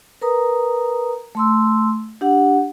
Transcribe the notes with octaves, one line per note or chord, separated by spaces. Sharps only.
A#4 B4 A#5 D#6
A3 C6 E6
D4 G4 F#5